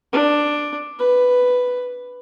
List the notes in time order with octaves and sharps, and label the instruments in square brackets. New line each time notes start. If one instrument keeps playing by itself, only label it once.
[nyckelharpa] D4
B4